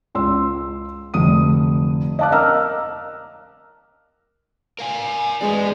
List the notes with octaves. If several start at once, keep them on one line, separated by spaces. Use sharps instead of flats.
C#2 C6 E6
F1 D3 D#6 D#7
D#5 F5 A5 D6 F#6
A#4 D#5 A#5 E6 F6
A#4 F5 G#5
G#3 B4 D5